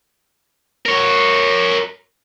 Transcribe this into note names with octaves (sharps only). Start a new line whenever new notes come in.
A#4 C#5